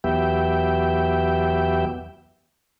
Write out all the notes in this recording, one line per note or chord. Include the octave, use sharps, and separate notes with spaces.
E2 F#3 B3 G4 E5 G5